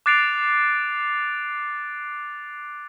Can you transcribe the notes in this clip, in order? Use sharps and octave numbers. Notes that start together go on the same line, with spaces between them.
D6 F#6 A6 C7 D7 F7